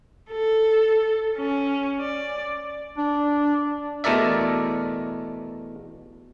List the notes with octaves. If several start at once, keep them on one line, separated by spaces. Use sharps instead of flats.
A4
C#4
D5
D4
E2 B2 A3 A#4 D5 E5